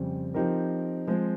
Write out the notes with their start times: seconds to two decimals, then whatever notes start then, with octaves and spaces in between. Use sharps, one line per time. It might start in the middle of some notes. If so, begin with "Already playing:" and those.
Already playing: F2 C#3 G3 C4
0.34 F3 C4 D#4 G4 A#4
1.07 F3 G#3 C4